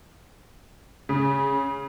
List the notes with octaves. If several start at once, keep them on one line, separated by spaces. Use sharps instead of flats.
C#3